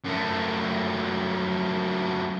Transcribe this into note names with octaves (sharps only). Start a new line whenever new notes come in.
F#2 A3